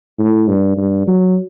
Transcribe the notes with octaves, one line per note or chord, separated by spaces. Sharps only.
A2
G2
G2
F#3